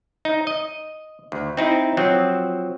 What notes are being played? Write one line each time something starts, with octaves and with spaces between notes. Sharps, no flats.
D#4
D#5
D2
C4 D#4 E4
F3 F#3 C4